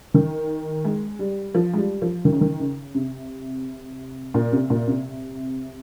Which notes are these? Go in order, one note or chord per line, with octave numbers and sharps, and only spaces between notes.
D#3
G#3
G3
F3
G#3
G3
F3
D#3
C#3
D#3
C#3
C3
A#2
C3
A#2
C3